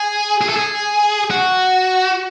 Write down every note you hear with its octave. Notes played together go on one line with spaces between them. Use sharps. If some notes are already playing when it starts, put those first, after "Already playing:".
Already playing: G#4
G#4
A4
G#4
F#4